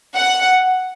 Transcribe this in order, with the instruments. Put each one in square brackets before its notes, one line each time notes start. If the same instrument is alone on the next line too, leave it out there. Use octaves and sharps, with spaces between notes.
[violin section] F#5